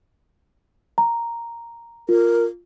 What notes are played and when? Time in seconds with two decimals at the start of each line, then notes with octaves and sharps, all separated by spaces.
0.98 A#5
2.09 F4 A#4